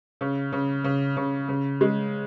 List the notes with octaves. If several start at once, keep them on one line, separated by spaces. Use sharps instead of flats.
C#3
C#3
C#3
C#3
C#3
G#3